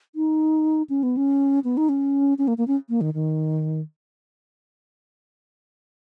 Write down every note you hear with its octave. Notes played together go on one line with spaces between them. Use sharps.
D#4
C#4
B3
C#4
B3
D#4
C#4
C#4
A#3
A#3
C#4
A#3
D#3
D#3